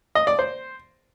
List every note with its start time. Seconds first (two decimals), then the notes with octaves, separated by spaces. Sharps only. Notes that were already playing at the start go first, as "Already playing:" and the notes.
0.15 D#5
0.27 D5
0.39 C5